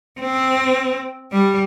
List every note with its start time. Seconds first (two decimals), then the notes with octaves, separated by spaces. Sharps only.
0.20 C4
1.32 G3